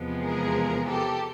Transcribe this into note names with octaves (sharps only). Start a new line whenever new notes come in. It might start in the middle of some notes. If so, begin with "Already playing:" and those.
Already playing: E2 C3 F3 G#3 B3
G#4 A#4
G4 A4